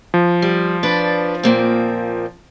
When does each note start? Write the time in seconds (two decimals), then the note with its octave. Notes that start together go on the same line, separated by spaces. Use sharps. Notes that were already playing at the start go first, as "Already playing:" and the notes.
0.14 F3
0.42 G3
0.83 D4 B4 D5
1.43 A#2 A#3 C4